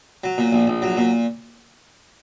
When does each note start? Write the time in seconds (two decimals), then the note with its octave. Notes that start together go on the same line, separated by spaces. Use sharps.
0.24 F#3
0.38 A#2
0.53 A#1
0.67 A#1
0.82 F#3
0.97 A#2